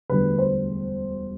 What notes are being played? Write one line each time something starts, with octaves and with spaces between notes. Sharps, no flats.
E1 D2 D3 G3 B4
C5